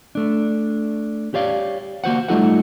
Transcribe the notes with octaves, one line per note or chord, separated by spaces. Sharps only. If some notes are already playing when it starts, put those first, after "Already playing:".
A3 D4
G4 C#5 D5 F5
A#3 F#4 C5 F#5
G3 A3 D#4 F4 A4 F#5